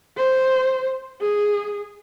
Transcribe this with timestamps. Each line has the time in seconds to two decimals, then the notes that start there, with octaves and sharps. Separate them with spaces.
0.17 C5
1.21 G#4